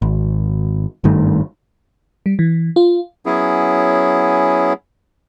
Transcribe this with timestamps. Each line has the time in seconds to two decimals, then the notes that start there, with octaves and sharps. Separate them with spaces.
0.02 G#1
1.04 G#1 G2 D#3 A3
2.26 G3
2.39 E3
2.76 F4
3.26 F#3 B3 C#4 E4 G#4